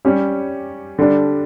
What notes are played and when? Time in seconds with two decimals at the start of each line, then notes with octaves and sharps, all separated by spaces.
0.05 G3 C#4 G4 C#5
0.99 D3 G3 D4